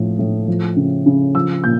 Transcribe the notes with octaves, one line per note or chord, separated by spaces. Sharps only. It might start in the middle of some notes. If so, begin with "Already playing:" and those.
Already playing: A2 F3
A2
F3
C#3
C#3
F3 E6
A#2 G6